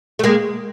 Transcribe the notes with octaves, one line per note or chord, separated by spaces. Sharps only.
A3
G#3 A#3